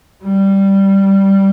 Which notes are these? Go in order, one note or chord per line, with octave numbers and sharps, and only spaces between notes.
G3